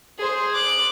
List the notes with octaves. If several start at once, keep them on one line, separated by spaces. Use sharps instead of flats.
G#4 C5
D6 F#6